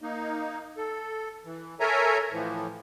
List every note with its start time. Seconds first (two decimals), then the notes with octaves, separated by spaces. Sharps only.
0.01 A#3 D#4
0.77 A4
1.45 E3
1.80 A4 A#4 C#5 E5 G#5 A#5
2.32 A2 E3 F3